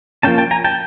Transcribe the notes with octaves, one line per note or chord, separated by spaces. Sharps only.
F3 A#3 C#4 G5 A5
G5 A5
G#5 A#5
G5 A5